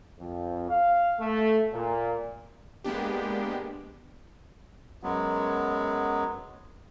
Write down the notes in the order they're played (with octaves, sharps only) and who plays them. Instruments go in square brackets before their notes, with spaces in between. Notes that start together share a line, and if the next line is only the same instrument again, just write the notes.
[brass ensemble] F2
F5
A3
A#2
[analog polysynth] G#3 A#3 B3 D4 G4
[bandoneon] F#2 F#3 G#3 B3